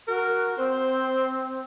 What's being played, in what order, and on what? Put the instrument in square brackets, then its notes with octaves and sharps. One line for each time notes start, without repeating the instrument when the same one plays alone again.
[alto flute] F#4 [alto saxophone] A#4
[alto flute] C4 [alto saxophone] C5